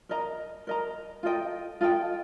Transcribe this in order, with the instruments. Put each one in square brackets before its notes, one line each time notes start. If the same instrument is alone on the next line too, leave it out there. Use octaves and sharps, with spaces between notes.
[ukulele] A#4 D#5 A#5
A#4 D#5 A#5
F4 A4 D#5 G5
F4 A4 D#5 G5